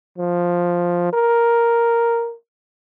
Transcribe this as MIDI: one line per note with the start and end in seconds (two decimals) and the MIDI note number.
0.18 1.09 53
1.13 2.34 70